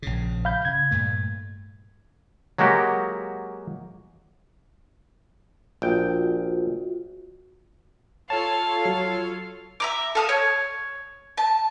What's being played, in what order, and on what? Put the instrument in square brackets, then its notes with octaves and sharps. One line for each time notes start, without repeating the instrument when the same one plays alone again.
[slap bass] A#1 C#3
[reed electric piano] F5 B5 G6
[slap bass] C#3 [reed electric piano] G#6
[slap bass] G2 A#2 A3
[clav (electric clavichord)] F#3 G#3 A#3 F#4 G4
[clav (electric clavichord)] A#1 G5 [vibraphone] F4 F#4
[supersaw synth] F4 A4 C#5 [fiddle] F5 [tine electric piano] A5
[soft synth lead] F#3
[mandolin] E5 A#5 D6
A4 F5 D#6
C#5
A5